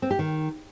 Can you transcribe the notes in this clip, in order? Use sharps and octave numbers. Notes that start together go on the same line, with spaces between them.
C4
G4
D#3